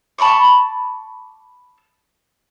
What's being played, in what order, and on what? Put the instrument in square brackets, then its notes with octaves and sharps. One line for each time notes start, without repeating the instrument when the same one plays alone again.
[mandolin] A5 B5 C#6 D6